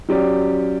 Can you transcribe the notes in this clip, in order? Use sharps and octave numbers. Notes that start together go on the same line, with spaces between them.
F#3 C#4 G4 D5